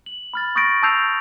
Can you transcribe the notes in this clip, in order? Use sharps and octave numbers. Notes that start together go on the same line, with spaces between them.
F#7
B5 F6 A6
C#6 D#6 G6 A6 A#6 D7
A5 D#6 E6 G6 C7 F7